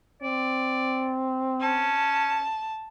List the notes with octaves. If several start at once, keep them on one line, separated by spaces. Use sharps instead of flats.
C4 D5
C#4 A5